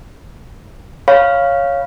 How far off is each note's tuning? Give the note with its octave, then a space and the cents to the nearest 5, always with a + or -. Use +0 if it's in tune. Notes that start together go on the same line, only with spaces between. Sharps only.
C#5 +0 F5 +0 B5 +0